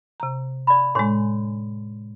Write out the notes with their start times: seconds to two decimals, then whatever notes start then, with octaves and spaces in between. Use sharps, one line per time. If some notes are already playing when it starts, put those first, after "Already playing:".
0.20 C3 A#5
0.67 D5 B5
0.95 A2 G#3 D4 C#5 C6